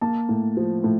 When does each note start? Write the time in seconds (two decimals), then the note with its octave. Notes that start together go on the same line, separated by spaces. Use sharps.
0.01 A#3 A5
0.29 A2
0.57 F3
0.84 A2